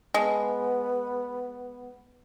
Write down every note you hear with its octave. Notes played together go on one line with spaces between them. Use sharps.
G#3 B3